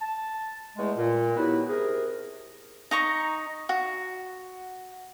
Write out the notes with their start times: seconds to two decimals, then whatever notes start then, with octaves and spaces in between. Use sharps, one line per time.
0.01 A5
0.77 E2 G#3 A3
0.97 A#2
1.36 D#3 F#3 B3 E4 G4 B4
1.69 C3 G#4 A#4
2.91 D#4 A#5 C#6
3.69 F#4